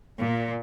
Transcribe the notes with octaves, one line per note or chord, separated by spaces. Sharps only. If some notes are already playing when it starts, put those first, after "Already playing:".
A#2